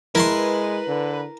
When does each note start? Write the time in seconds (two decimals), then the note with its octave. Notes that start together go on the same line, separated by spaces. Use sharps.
0.15 G#3 E4 A#4 B4 A5 C6
0.88 D3